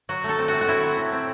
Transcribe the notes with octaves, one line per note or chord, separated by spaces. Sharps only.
F#3 F#4
A3
A4
C4
F#4
A3
F#4
C4 E4
F#3
A2
C4